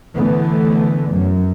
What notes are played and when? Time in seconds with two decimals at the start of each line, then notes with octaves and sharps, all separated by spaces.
0.15 D3 E3 A3 B3
1.12 F#2